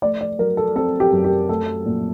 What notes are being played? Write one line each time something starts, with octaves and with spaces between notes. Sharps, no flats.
A3 D5
D5
F#3 A#4
A4
C4 A4
G4
F#2
G4
A3 A4
A#2